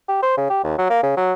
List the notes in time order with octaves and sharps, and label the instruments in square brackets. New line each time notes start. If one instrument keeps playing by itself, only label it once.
[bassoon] G4
C5
C#3
G4
D#2
F#3
A#3
C#3
F#3